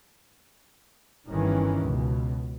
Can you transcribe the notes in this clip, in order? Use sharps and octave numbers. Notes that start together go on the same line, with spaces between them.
G1 G2 D#3 E3 C#4
C#2 B2